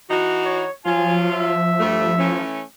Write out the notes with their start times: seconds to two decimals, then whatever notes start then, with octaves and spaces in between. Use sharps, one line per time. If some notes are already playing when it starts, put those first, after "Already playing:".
0.10 E3 D#4 F#4
0.45 C#5
0.86 F3 F#3 F4 G#5
1.30 E5
1.80 G2 G3 A3
2.18 E3 A3 C#4